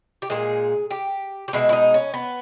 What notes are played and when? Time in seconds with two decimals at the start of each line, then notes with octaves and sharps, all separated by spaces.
0.22 G4
0.30 A#2 G#3 G#4
0.91 G4
1.48 G4
1.53 B2 G#3 E4
1.69 E4
1.73 D#4
1.94 C#4
2.14 B3